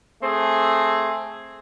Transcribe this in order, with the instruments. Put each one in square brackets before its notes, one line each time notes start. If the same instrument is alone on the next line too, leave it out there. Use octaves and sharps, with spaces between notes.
[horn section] A3 C4 G#4